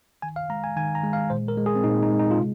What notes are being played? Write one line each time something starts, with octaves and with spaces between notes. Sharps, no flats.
D#3 G#5
F5
G#3 A#5
G#5
D#3 G#5
A#5
G#3
F5
A#2 C5
A#4
G#3
G#4
C4
A#2 D#4
D#4
G#3
D#4
F4
C3